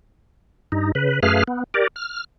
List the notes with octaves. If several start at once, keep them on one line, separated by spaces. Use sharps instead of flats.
G2 D#4
C#3 B4
F#2 A3 G#4 B4 F5 F6
B3
G4 A#4 D5
F6